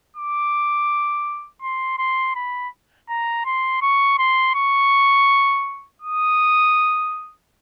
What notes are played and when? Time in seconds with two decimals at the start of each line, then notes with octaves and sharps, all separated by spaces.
0.17 D6
1.62 C6
1.99 C6
2.35 B5
3.09 A#5
3.45 C6
3.82 C#6
4.19 C6
4.55 C#6
6.02 D#6